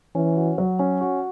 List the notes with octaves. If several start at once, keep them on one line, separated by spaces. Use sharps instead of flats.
E3 C#4
F#4
F#3
C#4
F#4